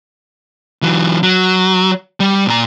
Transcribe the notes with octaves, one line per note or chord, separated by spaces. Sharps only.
E3 F#3
F#3
G3
A#2 A#5